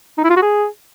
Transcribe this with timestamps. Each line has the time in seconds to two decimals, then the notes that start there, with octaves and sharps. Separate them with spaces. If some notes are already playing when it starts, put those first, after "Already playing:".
0.18 D#4
0.24 E4
0.30 F4
0.36 F#4
0.43 G#4